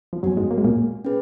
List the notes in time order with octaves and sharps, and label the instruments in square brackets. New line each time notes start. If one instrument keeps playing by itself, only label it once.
[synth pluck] F3
[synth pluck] F#2 F#3 [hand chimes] B3 F#4 C#5 G#5
[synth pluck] G#2 G#3
A#3
G#3
A#2 A#3
[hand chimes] C#4 G#4 B4